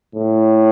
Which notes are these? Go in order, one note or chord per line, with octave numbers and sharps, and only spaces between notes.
A2